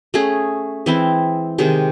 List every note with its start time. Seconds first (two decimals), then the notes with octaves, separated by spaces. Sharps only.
0.14 A3 C#4 G#4
0.86 E3 G#3 C4 E4
1.58 C3 D#3 G#3 C4